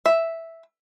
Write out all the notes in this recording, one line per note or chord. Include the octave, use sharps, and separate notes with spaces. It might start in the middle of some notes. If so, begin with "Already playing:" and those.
E5